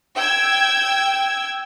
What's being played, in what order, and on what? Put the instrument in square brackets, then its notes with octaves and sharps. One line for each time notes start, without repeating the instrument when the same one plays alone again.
[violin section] G5 E6 G#6